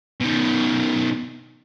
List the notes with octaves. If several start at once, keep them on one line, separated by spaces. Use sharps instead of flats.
B2 D#3